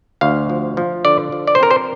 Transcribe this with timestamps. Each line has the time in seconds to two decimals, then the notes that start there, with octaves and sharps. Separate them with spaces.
0.21 D2 F5
0.50 F3
0.77 F3
1.05 D3 D5
1.32 F3
1.48 D5
1.55 C5
1.60 C4 A#4
1.71 C5